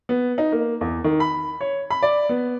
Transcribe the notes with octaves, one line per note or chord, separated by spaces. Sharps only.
B3
D#4
A#3
E2
D#3
B5
C#5
B5
D5
B3